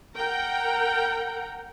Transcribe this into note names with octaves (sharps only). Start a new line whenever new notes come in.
A#4 F#5 G5 A#5